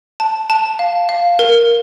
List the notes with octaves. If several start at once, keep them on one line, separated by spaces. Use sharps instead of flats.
A5
A5
F5
F5
A#4